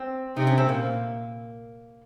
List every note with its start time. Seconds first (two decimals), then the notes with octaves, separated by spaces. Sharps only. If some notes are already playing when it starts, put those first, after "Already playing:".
Already playing: C4
0.36 C3 D#4
0.47 C#4
0.58 C4
0.68 A#2 A#3